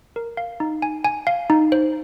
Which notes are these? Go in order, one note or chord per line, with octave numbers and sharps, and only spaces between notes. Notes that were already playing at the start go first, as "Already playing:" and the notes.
A#4
F5
D#4
G#5
G#5
F5
D#4
C5